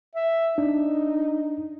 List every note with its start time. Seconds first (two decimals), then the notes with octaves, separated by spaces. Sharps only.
0.15 E5
0.58 D4 D#4